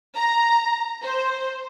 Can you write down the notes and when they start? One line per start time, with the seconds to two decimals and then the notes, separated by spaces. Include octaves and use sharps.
0.15 A#5
1.02 C5